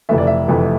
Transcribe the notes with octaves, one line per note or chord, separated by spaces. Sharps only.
F1 F2 E3 A3 E5
D5
E5
F1 F2 E3 A3